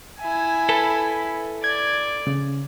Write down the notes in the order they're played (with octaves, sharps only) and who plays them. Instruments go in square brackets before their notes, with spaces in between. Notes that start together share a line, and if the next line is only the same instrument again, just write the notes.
[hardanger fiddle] E4 G#5
[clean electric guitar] A4 B4 A5
[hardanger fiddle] D5 [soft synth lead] G#6
[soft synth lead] C#3